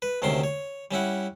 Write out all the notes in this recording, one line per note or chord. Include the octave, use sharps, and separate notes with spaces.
B4
D2 C3 D#3 C#4 C6
C#5
G3 C#4 E4 F#5